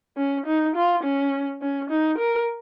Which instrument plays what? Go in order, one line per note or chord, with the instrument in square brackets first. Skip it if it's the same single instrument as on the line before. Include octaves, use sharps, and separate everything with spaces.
[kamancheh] C#4
D#4
F4
C#4
C#4
D#4
A#4